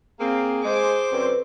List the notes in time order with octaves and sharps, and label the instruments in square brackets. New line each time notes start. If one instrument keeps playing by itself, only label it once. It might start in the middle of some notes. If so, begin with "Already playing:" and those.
[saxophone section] A#3 C4 [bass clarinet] G#4
[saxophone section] G#3 [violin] C5 D6
[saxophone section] F#2 D3 C4 [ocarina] B4